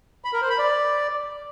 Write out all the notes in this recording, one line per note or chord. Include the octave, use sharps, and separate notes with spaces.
B5
A#4
C5
B5
D5